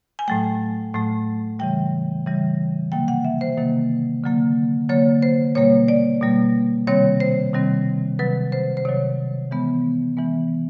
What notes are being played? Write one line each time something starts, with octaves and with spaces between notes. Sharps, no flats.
G#5
A2 F#3 A3 G5
A2 F#3 A3
C#3 E3 G3 G5
C#3 E3 G3
C3 D#3 F#3 A#3 G5
F#5
E5
C5
C3 D#3 F#3 A#3
D3 F#3 A#3
D3 F#3 A#3 C#5
C5
B2 G3 A#3 C#5
D5
B2 G3 A#3
C3 D#3 G3 C4 C#5
C5
C3 D#3 G3 C4
C3 D#3 F#3 B4
C5
C5
C3 D#3 F#3 C#5
E3 G#3 B3
E3 G#3 B3